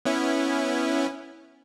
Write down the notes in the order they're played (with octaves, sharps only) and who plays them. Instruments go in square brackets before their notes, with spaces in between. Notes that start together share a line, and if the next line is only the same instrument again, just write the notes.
[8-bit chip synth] B3 C#4 E4